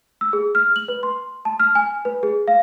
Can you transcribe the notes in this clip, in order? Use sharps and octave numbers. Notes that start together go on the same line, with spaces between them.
E6
G#4
F6
F#7
B4
C6
A5
F6
G#5
B4
G#4
F5